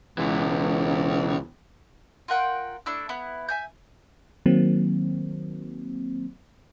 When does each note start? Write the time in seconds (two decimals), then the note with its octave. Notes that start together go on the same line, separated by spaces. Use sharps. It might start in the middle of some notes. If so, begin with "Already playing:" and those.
0.18 C#2 B2 E3
2.28 F4 A#4 F#5 G5
2.86 A3 D4 E4 E6
3.09 B3 E4
3.49 E5 G#5 G6
4.46 D#3 F#3 A#3 C4